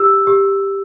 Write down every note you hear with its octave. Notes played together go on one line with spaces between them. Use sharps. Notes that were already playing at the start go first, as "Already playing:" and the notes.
Already playing: G4 E6
G4